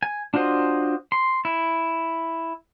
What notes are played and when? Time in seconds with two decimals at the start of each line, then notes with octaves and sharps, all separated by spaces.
0.03 G#5
0.34 D4 F4 F#4 C5 D#5
1.12 C6
1.45 E4